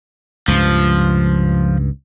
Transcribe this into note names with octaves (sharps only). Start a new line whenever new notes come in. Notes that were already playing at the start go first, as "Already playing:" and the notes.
C#2 G2 F3